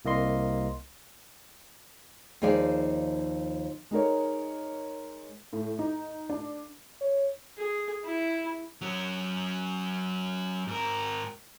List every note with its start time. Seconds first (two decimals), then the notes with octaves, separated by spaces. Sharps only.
0.05 C2 A#3 D#5 C6
2.42 D#2 F3 D#4 G#4 D5 F5
3.91 G#3 D#4 A#4 C#5
5.53 A2
5.79 D#4
6.29 D4
7.01 C#5
7.58 G#4
8.04 E4
8.81 F#3 C#4
10.67 G#2 A#4